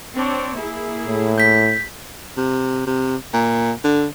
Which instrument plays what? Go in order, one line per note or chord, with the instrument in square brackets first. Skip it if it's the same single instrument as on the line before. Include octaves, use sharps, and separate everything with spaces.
[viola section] C4 D4 C#5
A#3 E4 G#4
[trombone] A2
[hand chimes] G6 B6
[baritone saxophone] C3
C3
A#2
D3